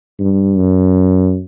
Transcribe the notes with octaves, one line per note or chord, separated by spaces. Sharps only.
G2
F#2